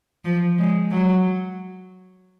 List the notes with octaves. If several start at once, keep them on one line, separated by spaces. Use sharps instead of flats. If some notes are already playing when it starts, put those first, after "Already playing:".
F3
G#3
F#3